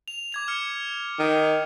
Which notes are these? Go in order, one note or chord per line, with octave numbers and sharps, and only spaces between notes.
F7
D6 G#6 F7
F6 C#7
D#3